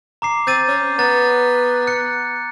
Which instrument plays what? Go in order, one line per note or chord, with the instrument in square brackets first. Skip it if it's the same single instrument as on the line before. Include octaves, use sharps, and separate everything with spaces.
[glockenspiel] A#5 D6 C7
[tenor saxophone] C4 [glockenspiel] G6 A6 D#7
[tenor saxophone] C#4
[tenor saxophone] B3 [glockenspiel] A#5 A6
[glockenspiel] F#6 C#7